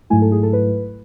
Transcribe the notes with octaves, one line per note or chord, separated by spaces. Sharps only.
G#2 F#3 A3 E4 G#5
A4
G#4
A4
B4